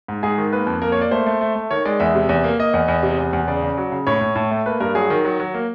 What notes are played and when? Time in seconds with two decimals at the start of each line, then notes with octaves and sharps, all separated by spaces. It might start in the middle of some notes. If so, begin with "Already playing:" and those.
0.08 G#2
0.23 G#2 G#4
0.38 D#3
0.53 A#3 B4
0.67 F2
0.82 A#3 A#4
0.92 C#5
0.97 A#3 D5
1.11 A3 C5
1.26 A3
1.41 A3
1.55 A3
1.71 D#3 C#5
1.85 G#3 D5
2.00 E2 E5
2.15 C3
2.29 E2
2.44 A#3
2.59 A#3 D#5
2.74 E2
2.88 E2
3.03 C3
3.19 E2
3.33 E2
3.47 C#3 D5
3.62 C#3
3.77 F#3
3.92 C#3
4.07 A2 C#5
4.21 A2
4.36 A2
4.51 A3
4.66 A#3 B4
4.80 G2 A#4
4.95 F#3 G#4
5.10 D#3
5.25 F#3
5.40 F#3
5.54 A#3